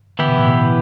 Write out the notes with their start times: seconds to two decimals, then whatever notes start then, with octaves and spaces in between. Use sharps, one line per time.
0.19 D3 E3 B3 E4 G4
0.28 B2
0.38 A2
0.47 B2